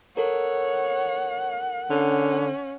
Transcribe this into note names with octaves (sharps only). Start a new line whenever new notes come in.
A4 A#4 C#5 F#5
D3 C#4